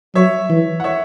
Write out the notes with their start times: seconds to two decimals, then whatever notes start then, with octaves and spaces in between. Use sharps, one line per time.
0.15 F#3 C#5 E5
0.50 E3
0.80 F#5
0.84 C#5 E5